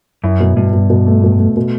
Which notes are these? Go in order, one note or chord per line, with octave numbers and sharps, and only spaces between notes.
F#2 E4
B2
G2 B2
B2
B2
A3
B2
A3
B2